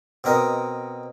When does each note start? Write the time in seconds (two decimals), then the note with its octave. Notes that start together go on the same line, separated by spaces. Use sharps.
0.24 B2 C4 A#4 D#5